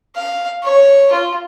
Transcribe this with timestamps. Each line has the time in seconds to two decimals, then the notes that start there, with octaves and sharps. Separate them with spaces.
0.16 F5
0.63 C#5
1.13 F4